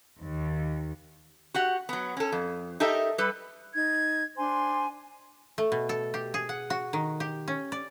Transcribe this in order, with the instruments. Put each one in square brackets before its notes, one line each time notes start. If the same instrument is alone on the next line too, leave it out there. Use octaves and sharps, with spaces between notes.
[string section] D#2
[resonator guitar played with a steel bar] F#4 G4 F#5
F#3 B3
C#4 A4
F2
D#4 G4 A4 A#4 E5
G3 A4 B4
[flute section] D#4 G#6
D4 C5 G#5 C6
[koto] A3
B2
A4
G4
G#4
F#5
F#4
D#3
G4
C#4
D5